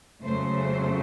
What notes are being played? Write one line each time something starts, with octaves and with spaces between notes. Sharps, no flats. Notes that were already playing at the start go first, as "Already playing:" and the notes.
F2 C#3 F#3 A3 C#4 C5